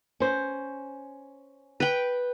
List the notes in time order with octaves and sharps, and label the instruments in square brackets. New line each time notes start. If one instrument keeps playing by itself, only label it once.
[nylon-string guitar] C#4 C5
[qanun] B4 G5